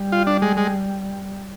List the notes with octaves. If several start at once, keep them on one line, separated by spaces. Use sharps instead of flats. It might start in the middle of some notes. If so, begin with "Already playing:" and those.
Already playing: G3
F4
D4
G#3
G#3